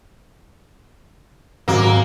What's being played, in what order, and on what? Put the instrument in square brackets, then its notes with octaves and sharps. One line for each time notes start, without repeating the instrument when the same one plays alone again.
[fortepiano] G#1 F#3 [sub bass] G#2 [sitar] A#3